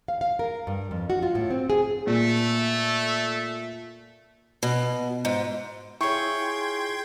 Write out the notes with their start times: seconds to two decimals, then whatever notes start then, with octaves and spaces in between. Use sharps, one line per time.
0.08 F5
0.21 F5
0.39 A#4
0.67 G2
0.91 F2
1.10 F#4
1.23 F4
1.35 A2
1.50 C4
1.70 G#4
2.07 A#2 A3
4.63 B2
5.25 G#2
6.01 E4 F4 G#4 C#5 G5 C6 C#6 G#6